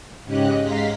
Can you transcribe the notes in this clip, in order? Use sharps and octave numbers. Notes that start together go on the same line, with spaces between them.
G#2 C#3 C#4 G4 D#5 F#6
G#2 G#3 F5 A#5 C6 B6